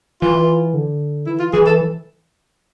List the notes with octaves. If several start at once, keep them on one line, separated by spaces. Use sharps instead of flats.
E3 F4
D3
E3 E4
F4
E3 G#4
A4